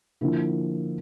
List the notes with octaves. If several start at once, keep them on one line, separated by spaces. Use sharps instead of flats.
D3 F3 A#3 E4